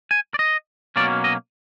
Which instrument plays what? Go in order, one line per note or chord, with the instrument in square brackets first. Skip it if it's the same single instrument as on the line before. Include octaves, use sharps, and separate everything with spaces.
[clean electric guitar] G#5
D5
D#5
B2 F#3 A#3 C#4 D5
D#5